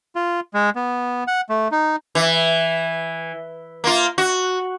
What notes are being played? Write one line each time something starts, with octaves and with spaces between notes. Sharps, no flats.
F4
G#3
B3
F#5
A3
D#4
E3
A#3 F4
F#4